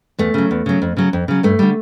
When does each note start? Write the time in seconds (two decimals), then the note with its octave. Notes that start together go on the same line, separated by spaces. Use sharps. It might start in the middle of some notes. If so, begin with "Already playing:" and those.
0.18 E2 A3
0.34 C#3 F#3
0.51 E2
0.66 C#3 F#3
0.82 F2
0.97 C#3 F#3
1.13 F2
1.28 C#3 F#3
1.43 G2 A3
1.59 D3 G3